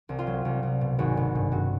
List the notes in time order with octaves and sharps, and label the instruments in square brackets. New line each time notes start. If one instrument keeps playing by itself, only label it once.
[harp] C2
F4
F#3
C2
C2
B2
G#1 F#4
G#1
G2
G2 F#4